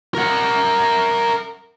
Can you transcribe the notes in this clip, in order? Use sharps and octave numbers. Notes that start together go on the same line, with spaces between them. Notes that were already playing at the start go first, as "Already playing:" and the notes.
A#4 F#5